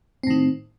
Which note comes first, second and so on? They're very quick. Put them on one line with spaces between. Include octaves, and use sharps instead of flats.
C4 A2 D#3